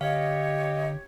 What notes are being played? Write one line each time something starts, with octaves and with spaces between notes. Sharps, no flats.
D3 G4 C#5 D#5 F5